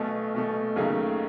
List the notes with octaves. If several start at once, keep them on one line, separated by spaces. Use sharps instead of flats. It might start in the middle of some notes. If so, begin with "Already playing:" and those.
Already playing: B1 B2 A3
B1 B2 A3
D#2 C#3 F#3 A3 D#4